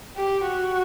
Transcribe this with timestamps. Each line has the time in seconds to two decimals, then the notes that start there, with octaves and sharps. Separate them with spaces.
0.17 G4
0.47 F#4